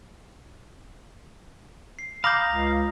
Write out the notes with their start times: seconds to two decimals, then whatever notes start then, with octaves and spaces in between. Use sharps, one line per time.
1.99 C7
2.24 F5 A#5 B5 D6 D#6 G6 A#6
2.49 C#2